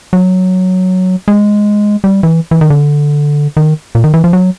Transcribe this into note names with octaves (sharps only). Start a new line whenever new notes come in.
F#3
G#3
G3
E3
E3
D#3
D3
D#3
A#2
D#3
E3
F3
F#3